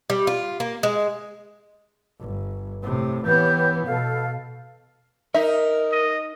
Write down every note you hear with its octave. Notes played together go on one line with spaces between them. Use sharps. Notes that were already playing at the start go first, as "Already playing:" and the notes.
G3
F4
A#3
G#3
G1
A2 C3
E3 B3 G4 C#5 G6
B2 A4 F5
D#4 A#4 E5
D#5